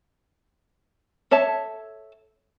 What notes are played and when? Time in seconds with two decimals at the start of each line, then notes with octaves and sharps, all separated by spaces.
1.31 A4 C#5 E5 A5